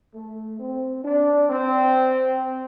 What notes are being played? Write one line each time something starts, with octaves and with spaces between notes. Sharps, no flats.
A3
C4
D4
C4